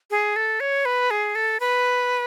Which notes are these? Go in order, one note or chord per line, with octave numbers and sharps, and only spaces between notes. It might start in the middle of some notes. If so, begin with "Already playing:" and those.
G#4
A4
C#5
B4
G#4
A4
B4